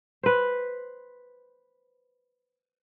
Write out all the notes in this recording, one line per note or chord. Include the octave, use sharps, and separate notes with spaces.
B4 C5